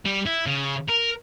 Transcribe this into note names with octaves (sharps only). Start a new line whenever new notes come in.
G3
E4
C#3
A#4